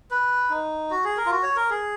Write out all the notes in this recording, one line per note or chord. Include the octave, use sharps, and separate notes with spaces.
B4
D#4
F#4
G#4
A#4
F4
F#4
C#5
A#4
G#4